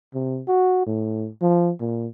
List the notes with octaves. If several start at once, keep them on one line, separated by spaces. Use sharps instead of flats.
C3
F#4
A2
F3
A#2